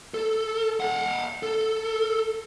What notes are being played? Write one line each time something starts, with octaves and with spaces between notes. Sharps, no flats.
A4
F5 F#5
A4